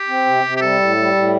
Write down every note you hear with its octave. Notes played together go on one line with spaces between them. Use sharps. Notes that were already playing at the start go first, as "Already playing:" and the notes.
Already playing: G4
C4
C3
C3
G4
G3 A4
A2
G3
A2